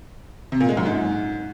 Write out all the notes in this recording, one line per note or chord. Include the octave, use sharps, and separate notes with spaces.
C3
A#2
G#3
F#2
G#2